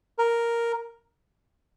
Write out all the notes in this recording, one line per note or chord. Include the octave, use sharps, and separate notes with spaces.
A#4